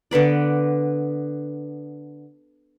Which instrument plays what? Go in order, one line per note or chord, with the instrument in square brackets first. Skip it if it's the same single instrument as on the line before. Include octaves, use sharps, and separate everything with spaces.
[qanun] D3 B3 B4 D5